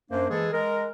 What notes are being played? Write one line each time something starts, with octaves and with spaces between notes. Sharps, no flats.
F#2 A#3 D4 C5
E3 G#3 G#4 A4
G#3 A#4